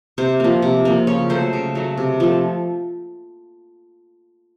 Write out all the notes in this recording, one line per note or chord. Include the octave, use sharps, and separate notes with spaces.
C3 C5
F3 A#3
C3
F3 A#3
C#3 C#5
F#3 A3 C5
C#3
F#3 A3
C3
F3 A3